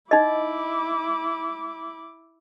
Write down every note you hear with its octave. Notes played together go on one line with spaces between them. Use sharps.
D#4 E4 D#5 D6